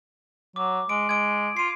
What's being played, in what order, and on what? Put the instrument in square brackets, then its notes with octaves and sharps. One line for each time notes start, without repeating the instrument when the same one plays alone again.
[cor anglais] F#3 [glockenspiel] D6
[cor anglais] G#3 [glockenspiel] D7
[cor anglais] G#3 [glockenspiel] G#6 D7
[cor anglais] F4 [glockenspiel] C7 D#7